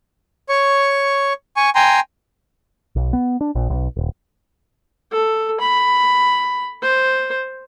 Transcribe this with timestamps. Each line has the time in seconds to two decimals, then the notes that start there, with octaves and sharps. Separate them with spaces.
0.49 C#5 C#6
1.57 G#5 C#6
1.75 G5 G#5 A#5 C6
2.96 B1
3.13 B3
3.41 D4
3.55 A#1
3.70 B1
3.97 D#1
5.12 A4
5.60 B5
6.83 C5